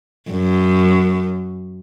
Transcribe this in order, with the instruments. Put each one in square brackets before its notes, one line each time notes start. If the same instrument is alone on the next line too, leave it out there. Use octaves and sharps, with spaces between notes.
[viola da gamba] F#2